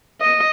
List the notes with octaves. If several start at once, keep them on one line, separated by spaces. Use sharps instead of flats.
D#5